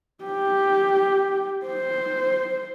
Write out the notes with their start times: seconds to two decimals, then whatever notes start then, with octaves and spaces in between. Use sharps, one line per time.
0.24 G4
1.66 C5